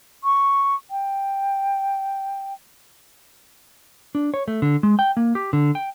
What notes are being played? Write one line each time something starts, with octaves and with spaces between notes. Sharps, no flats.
C#6
G5
D4
C#5
A3
D3
G#3
G5
A#3
G4
D3
G5